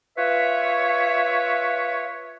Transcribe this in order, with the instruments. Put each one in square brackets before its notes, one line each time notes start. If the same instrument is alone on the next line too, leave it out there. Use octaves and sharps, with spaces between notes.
[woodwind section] F4 B4 C#5 E5